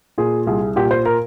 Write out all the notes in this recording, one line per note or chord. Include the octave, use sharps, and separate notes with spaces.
A#2 G#4
C2 G#4
A#2 G4
C5
A#4